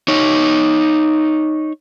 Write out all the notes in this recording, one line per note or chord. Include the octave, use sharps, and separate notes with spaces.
D#4 C#5